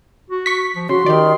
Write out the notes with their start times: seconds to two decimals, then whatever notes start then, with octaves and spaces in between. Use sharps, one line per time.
0.30 F#4
0.46 C#6 B6
0.76 F3
0.89 C#3 F#4 C6
1.06 D#3 G4 D5